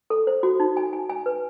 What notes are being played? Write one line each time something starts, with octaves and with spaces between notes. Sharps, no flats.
A4
C5
F#4
D#4
G#5
G#5
G#5
B4